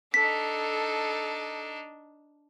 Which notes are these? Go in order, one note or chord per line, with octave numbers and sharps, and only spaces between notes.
D4 D#4 A4 B6